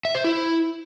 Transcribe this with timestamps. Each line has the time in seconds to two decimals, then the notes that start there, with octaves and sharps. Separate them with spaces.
0.05 E5
0.15 C5
0.24 E4